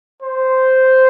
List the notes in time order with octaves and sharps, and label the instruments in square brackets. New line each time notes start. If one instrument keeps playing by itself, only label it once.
[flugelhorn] C5